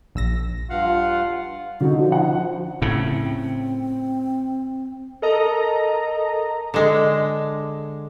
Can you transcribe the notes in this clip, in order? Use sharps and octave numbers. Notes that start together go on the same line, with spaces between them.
A#1 E6 A#6
G2 F4 F5 F#5
D3 D#4 F#4
F3
F#5
A2 C#3 C4
A4 A#4 D#5 A#5
D3 G#3